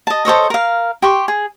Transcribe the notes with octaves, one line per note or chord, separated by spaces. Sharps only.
D#5 A5
A4 C5 C#5 D#5
A#4 F5
G4 C6 C#6
G#4